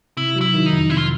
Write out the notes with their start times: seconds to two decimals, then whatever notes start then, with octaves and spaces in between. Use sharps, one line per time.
0.17 C3 E4
0.36 F#3
0.41 E4
0.54 D#3
0.66 D#4
0.72 F2
0.90 C3 E4
0.98 F4